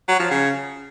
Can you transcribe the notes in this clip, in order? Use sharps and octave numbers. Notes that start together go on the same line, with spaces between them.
F#3
F3
C#3